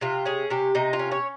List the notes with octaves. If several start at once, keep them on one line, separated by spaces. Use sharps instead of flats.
C3 F4
C#4 G#4
C3 G4
C3 D#4
F4
C#4
C#5